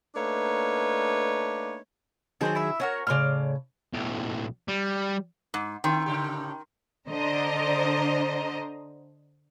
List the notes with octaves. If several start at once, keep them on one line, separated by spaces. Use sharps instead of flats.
A3 A#3 D4 D#4 B4 C#5
D#3 F#3 C4 G#4 C5 A5
E4 E5
C#4 F#4 A#4 C#5
A2 C#3 D5 C6 F6
B1 A2
G3
G#2
D#3 C4 E4 G5 C6
A2 C#3 G4
D3 C5 D#5 A#5